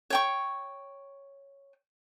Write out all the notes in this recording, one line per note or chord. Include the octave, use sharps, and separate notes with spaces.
C#5 G5 C#6